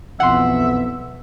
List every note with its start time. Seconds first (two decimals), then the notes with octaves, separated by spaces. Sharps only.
0.20 B1 F2 E3 B3 E5 F#5 C6